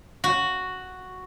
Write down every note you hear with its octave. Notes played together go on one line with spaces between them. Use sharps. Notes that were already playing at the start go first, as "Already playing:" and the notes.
F#4